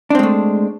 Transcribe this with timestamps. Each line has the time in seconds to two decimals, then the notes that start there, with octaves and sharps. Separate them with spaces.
0.10 D4
0.15 C4
0.19 G#3
0.23 A3